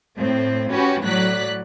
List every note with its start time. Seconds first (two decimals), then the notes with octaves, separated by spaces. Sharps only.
0.17 A2 C4
0.71 C#4 F#4 G4 B4
1.04 A2 F#3 D5 F#6 B6